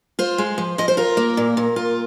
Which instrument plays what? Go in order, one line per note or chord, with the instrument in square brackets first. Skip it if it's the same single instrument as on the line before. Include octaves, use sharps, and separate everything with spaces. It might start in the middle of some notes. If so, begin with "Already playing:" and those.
[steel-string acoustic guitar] F4 C5
G#3
F3
F3 D#5
C5
F4 A#4
A#3
A#2
A#2
F4